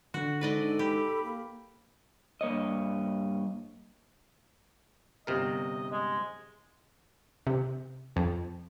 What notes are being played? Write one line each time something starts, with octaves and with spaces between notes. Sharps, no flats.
D3 F#4
G#2 A4 B4 D5 D#5
G4 B5
A#3
G2 A#3 C#5 D#5
G1 C3 A#4 D#5
G#3
C3
F2